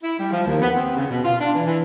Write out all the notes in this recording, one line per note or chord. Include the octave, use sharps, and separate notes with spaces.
E4
G3
F3
D#2
B3
C4
C#3
B2
F4
D4
E3
E3